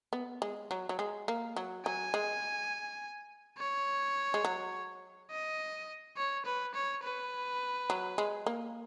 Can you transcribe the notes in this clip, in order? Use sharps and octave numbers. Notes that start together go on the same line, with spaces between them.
B3
G#3
F#3
F#3
G#3
A#3
F#3
F#3 G#5
G#3
C#5
G#3
F#3
D#5
C#5
B4
C#5
B4
F#3
G#3
A#3